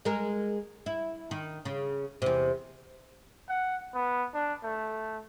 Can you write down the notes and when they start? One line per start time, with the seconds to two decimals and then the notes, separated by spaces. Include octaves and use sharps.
0.05 G#3 A#4
0.86 E4
1.31 D#3
1.65 C#3
2.22 E2 C3
3.49 F#5
3.94 B3
4.34 D4
4.64 A3